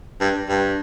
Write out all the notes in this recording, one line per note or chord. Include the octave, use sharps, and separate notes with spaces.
G2
G2